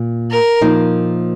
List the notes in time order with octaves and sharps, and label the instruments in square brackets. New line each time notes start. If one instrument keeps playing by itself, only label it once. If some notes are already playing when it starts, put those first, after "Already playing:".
Already playing: [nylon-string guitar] A#2
[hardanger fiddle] A#4
[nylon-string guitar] A#2 F3 A#3 D#4